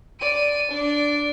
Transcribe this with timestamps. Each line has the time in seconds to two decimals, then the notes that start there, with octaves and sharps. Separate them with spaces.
0.20 D5 D#7
0.72 D4 D5